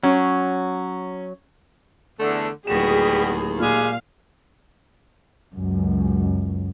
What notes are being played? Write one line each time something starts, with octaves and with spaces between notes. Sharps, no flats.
F#3 C#4
E2 D3 A3
D1 D#2 G3 B3 F#4 G#4 E7
A#2 G#3 G4 G#4 F5
C#2 F#2